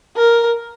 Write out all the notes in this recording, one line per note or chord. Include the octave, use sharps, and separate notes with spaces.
A#4